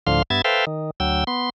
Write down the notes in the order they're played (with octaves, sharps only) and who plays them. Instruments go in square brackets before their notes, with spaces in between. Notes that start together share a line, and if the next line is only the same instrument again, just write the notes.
[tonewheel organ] D2 A2 D3 F3 F5 C6
G2 B3 E5 G#6 A6
A4 B4 C5 E5 F5 G5
D#3
D2 F#3 G5 E6
B3 C6